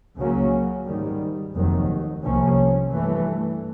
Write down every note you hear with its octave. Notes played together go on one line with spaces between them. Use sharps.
C#2 C#3 F#3 A#3 C#4
G#2 D#3 G3
F1 D#2 D#3 F#3
C2 C3 F3 A#3 C#4
G2 E3 A3